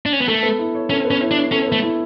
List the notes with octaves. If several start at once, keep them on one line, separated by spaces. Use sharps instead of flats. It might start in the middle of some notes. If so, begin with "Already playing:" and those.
D4
C#4
B3
A3 A4
B3
E4
C#5
C#4 A4
B3
C#4
E4
D4
C#5
C#4 A4
B3
A3
E4